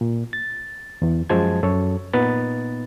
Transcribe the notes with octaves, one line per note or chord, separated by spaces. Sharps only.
A#2
A6
E2 E3
F#2 F3 G#3 C5 A5 G#6
F#2 A4 C#5
A#2 B3 D#4 B4 A6